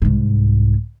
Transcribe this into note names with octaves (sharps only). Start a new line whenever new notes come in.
C2 G#2